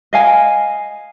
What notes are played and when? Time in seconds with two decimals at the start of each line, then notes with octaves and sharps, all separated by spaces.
0.13 D#5 F5 G#5